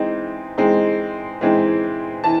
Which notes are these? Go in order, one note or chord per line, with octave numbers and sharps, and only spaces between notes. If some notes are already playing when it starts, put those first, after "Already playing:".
Already playing: E3 G#3 C4 D#4
E3 G#3 C4 D#4
E3 G#3 C4 D#4
E3 A5